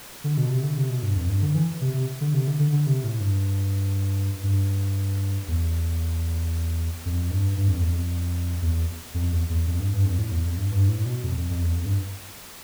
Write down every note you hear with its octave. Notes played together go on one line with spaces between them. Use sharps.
D3
B2
C3
D3
C3
B2
G2
F2
G2
D3
E3
C3
C3
D3
C3
D3
D3
D3
C3
A2
G2
G2
E2
F2
G2
G2
F2
E2
F2
E2
F2
E2
E2
F2
G2
G2
F2
A2
E2
F2
G2
G2
A2
B2
F2
F2
F2
E2
F2
G2